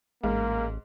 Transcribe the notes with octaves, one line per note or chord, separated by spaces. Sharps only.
A1 G#2 A#3